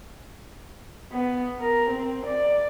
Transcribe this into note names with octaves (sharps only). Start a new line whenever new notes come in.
B3
A#4
C4
D5